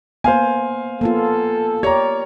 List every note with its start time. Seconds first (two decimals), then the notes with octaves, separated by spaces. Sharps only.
0.24 A#3 B3 C5 F5 G#5
1.01 A#3 B3 F4 A4
1.83 G4 A#4 C#5 D5 A#5